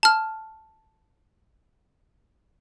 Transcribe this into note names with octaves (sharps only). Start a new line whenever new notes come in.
A5 F6